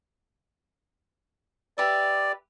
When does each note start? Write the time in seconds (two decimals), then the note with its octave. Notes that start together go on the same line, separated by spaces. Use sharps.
1.78 G4 B4 D5 E5